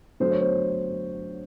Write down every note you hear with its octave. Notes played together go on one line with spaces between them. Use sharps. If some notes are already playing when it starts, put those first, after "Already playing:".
D3 F#3 A3 C5
C#5
C5